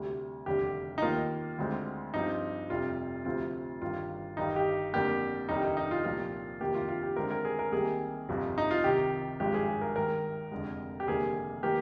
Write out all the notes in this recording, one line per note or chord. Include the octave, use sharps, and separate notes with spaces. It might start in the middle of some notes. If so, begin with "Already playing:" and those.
Already playing: D2 C3 G3
F1 D#2 D3 G3 G4
D#4
D#2 D#3 A#3 F4
D2 D3 G#3 C4
G2 F3 C4 D#4
F1 F2 C3 G3 F4
D2 C3 F3 C4 F4
G1 G2 D#3 F4
G1 G2 D#3 G3 D#4
G4
F2 D3 G3 A#3 G4
F1 D#2 D#3 G3 D#4
D#4
D#4
F4
C2 A#2 F3 F4
F2 C3 D#3 A#3 G4
F4
F4
G4
D#2 D3 G#3 C4 A#4
A#4
G#4
A#4
C2 C3 D#3 A#3 G#4
G1 F2 C3 F3
D#4
F4
C2 C3 D#3 G4
G#1 G2 F3 G#3 G4
G#4
G#4
A#4
D#2 D#3 G#3 A#4
F1 F2 D3 G#3
G4
F1 D#2 D3 G3 A#3 G#4
D#3 A#3 G4